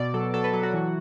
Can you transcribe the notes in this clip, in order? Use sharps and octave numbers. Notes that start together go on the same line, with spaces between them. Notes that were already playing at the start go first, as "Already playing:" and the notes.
Already playing: B2 D5
F#3 A4
F#3 A4
B4
F#3 A4
F#4
E3